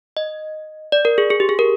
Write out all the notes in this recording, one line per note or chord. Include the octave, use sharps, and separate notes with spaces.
D#5
D5
A#4
G#4
G#4
G4
G#4
A#4